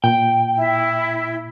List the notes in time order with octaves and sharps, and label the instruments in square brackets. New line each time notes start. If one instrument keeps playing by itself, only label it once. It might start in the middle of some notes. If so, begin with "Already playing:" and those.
[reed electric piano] A#2 [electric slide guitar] G5
[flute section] E4